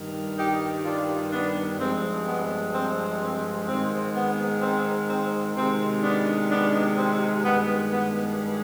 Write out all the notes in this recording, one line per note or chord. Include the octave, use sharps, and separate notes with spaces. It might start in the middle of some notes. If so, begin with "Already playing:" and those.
Already playing: G2 D#3 G3
D#4 G4
D4 F4
B3 D4
G2 F3 G#3 C4
B3
C4
C4
G#2 D#3 G#3 C4
B3
C4
C4
C3 D#3 G#3 C4
B3 D4
B3 D4
C4
G2 D#3 G#3 B3
B3